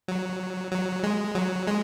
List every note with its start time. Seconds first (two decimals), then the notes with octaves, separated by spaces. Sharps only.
0.08 F#3
0.71 F#3
1.03 G#3
1.35 F#3
1.67 G#3